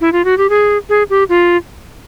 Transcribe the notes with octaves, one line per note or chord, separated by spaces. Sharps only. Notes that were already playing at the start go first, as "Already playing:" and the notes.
E4
F4
F#4
G4
G#4
G#4
G4
F4